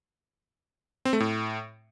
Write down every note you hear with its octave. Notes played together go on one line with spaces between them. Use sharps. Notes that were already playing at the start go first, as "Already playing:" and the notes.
C4
A3
A2